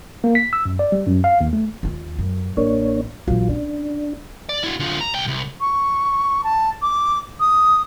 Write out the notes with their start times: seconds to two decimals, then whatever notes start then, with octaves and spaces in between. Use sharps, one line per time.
0.24 A#3
0.35 B6
0.53 E6
0.65 F#2
0.79 D5
0.92 G3
1.07 F#2
1.24 F5
1.41 D#2
1.53 A3
1.83 D#2 F4
2.19 F#2
2.57 A1 A#3 D4 C#5
3.27 A#1 E3 F#3 F4
3.49 C#4 D4
4.49 D5
4.64 E4 F#4
4.80 D3 F4
5.01 A#5
5.14 C2 G5
5.28 C2
5.61 C#6
6.44 A5
6.82 D6
7.40 D#6